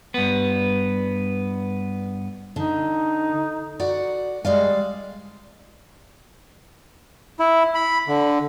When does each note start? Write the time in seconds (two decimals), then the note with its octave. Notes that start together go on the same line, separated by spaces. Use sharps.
0.14 G2 B3
2.56 D3 D#4
3.80 F#4 D5 F#5
4.45 G3 G#3 D5 F5
7.40 E4
7.75 B5
8.08 D3